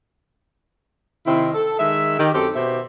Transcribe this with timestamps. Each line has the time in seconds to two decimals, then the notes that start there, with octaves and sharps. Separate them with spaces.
1.27 C3 D#3 C4 E4
1.54 A4
1.79 D#3 G#3 E5
2.19 D#3 G4
2.34 F#2 C4 G4 A4
2.55 B2 B3 G4 C5 E5